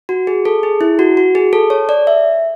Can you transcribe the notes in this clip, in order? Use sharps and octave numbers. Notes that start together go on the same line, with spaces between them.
F#4
G#4
A4
G#4
E4
F#4
F#4
G#4
A4
C#5
D5
E5